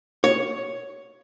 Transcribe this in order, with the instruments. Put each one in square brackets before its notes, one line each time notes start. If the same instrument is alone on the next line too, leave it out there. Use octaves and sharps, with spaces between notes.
[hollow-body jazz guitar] C#5